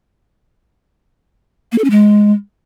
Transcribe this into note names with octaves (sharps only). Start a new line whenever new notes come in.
A#3
A4
C#4
G#3